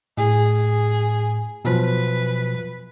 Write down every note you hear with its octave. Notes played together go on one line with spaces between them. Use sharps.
A2 G#4
B2 F3 F#3 B4